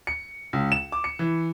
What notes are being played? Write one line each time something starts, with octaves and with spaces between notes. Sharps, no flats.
C#7
C#2
E7
D6
C#7
E3